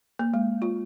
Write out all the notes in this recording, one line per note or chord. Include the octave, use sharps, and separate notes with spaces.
A#3
G#3
F4